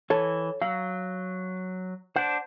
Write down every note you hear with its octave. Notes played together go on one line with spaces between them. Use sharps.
E3 A4 C#5
F#3 F5
D4 C5 F#5